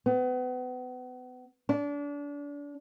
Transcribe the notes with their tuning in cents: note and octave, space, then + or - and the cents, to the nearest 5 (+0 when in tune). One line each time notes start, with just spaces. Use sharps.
B3 +35
D4 -30